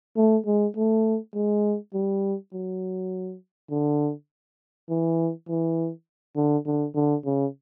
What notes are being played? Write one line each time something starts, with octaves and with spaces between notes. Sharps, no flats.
A3
G#3
A3
G#3
G3
F#3
D3
E3
E3
D3
D3
D3
C#3